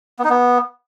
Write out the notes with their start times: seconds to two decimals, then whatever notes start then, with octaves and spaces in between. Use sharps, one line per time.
0.19 B3
0.24 D#4
0.30 B3